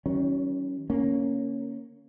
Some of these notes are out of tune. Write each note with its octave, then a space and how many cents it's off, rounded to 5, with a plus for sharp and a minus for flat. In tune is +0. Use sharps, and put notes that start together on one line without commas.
D#3 +35 F#3 +35 C#4 +0
D3 -35 A#3 +0 C#4 +0